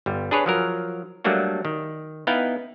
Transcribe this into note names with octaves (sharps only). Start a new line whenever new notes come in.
G1 G3
D4 G#4 B4 C#5
F3 F#3 A#4
F#3 G3 A3 A#3 D4 F#4
D#3
B3 D#4 E4 F5 G5